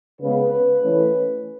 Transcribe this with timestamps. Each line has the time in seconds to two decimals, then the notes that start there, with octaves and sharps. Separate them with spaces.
0.21 C#3 G#3 B3 B4
0.80 E3 A3 C#4